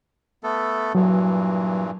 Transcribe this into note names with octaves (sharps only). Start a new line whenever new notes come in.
A3 B3 A4
G2 A#2 E3 F#3